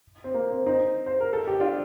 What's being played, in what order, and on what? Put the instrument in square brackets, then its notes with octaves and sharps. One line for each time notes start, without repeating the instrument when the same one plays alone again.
[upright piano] C4
A#3
C4
C4 D#4
C5
A#4
A4
G4
D4 F4